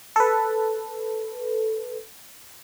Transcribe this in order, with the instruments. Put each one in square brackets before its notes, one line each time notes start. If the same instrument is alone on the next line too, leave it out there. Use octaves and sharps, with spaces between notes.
[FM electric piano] A4 B4